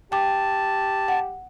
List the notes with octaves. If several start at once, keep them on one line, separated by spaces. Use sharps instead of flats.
G4 G5 A5 D6
F#5